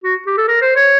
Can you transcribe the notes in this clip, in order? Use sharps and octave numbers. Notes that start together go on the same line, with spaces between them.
F#4
G4
A4
A#4
C5
C#5